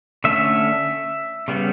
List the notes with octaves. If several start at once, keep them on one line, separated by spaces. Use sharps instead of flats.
D3 A3 C#4 E5
C#3 G3 B3